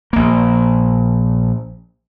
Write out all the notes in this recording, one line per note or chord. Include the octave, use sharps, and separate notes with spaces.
A#1 A#3